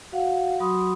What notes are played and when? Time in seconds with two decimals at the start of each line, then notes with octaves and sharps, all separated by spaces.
0.12 F#4 F5 F#5
0.60 F#3 F#4 B5 C6 D#6